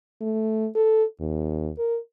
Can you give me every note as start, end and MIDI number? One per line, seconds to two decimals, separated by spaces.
0.21 0.68 57
0.75 1.04 69
1.20 1.70 39
1.78 1.98 70